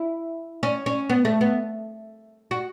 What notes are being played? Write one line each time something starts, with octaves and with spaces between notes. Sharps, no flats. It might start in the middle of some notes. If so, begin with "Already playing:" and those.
Already playing: E4
C#4
C#4
B3
A3
B3
F#4